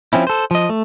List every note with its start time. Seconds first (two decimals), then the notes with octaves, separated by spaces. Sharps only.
0.13 F3 C4 C#4 E4
0.27 A4 C5
0.51 F3 D#5
0.69 A3